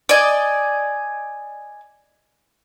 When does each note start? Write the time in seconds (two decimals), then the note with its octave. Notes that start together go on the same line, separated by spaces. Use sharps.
0.09 D5 D#5 G#5